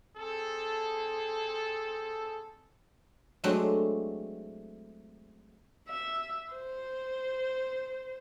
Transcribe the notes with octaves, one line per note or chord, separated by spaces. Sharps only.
C4 G#4 A4
F#3 G#3 A3 C4 D4 F#4
E5
C5